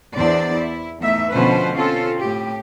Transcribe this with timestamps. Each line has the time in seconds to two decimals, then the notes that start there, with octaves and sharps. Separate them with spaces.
0.15 E2 D4 C5 D5
0.54 E4
0.99 E2 A3 D#4 E5
1.33 B2 D3 F3 C#4 B4 C5
1.74 C4 C#4 F4 A4
2.19 A2 G4